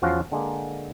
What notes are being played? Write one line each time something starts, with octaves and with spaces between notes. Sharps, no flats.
E2 F3 C#4 F4 F#4 F5
D3 G#3 A#3